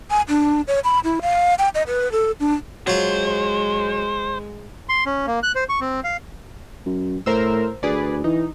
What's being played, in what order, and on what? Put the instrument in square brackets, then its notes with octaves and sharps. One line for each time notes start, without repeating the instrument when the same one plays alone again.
[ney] G#5
D4
C#5
B5
E4
F5
G5
D#5
B4
A4
D4
[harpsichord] F#3 F4 [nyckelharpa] G#3 [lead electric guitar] C5
[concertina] C6
C#4
A#3
F#6
C5
C#6
C4
F5
[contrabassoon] F#2
[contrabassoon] A2 [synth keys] A#4 C5 E6
[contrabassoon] D2 [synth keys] G#4 B4 D5
[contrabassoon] E3 [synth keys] D#4